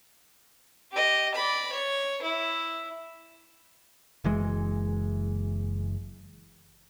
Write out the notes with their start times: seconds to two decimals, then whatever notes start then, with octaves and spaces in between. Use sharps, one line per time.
0.92 G4 D#5
1.35 D5 B5
1.72 C#5
2.22 E4
4.24 F#1 E3 G#3